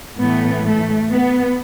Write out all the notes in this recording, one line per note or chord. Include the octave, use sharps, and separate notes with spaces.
A2 E3 A3 B3
A3
B3